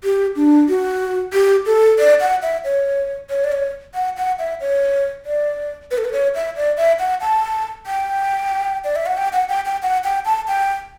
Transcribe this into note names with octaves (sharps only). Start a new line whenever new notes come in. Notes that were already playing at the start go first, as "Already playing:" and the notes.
G4
D4
F#4
G4
A4
D5
F#5
E5
C#5
C#5
D5
C#5
F#5
F#5
E5
C#5
D5
B4
A4
B4
C#5
E5
D5
E5
F#5
A5
G5
D5
E5
F#5
G5
F#5
G5
G5
F#5
G5
A5
G5